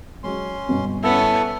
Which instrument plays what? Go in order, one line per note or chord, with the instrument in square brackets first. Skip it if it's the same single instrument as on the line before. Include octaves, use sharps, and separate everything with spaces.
[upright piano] F#3 G#3 [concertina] C#4 C6
[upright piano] G1 B2
[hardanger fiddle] B3 C#4 [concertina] E4 A4 E5